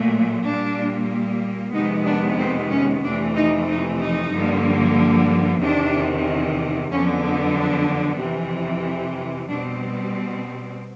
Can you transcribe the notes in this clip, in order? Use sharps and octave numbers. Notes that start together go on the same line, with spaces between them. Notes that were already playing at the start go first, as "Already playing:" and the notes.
Already playing: A#2 F#3 A3
A#2 G3 A#3 D4
F2 C3 D#3 G#3 B3 D#4
D4
C4
C#4
F2 C3 E3 A3 D4
D#4
D#4
D#4
G2 D3 F3 A#3
E2 C3 D#3 D4
F2 D3 F#3 B3 C#4
D4
F2 C3 E3
B2 G3 C4 D4